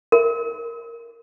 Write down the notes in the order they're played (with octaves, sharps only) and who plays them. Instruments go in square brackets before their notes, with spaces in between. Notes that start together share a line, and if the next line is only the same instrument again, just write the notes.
[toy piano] A#4